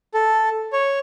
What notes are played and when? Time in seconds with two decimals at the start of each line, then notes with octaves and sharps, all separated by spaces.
0.14 A4
0.72 C#5